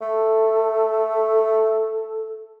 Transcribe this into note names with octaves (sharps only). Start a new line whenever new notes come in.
A3 A4